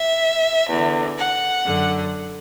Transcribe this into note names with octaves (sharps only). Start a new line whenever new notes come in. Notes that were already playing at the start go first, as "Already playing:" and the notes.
Already playing: E5
E2 D3
F#5
F#2 D3